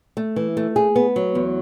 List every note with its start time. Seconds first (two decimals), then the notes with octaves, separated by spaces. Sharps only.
0.17 A3
0.36 E3
0.57 A3
0.76 G#4
0.96 B3
1.16 F#3
1.35 E2